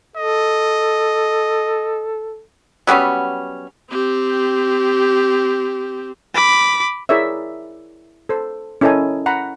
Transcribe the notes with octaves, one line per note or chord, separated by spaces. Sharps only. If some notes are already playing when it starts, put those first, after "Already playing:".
A4 D#5
F#3 G3 B3 C#4
C4 G4
B5 D6
E4 G#4 A#4 C#5 D5 E5
A4 C5
C#4 E4 A4 A#4 D#5 G#5
F#5 A#5 B5